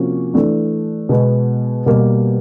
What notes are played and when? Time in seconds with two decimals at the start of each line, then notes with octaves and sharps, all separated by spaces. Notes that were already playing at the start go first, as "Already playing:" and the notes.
Already playing: C3 F3 A#3 C#4 F#4
0.34 E3 A3 D4
1.09 B2 G#3 B3
1.86 B2 G3 A#3